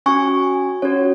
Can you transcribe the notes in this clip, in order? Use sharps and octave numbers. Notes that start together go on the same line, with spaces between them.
C#4 F#4 G#5 C#6
C#4 F#4 C#5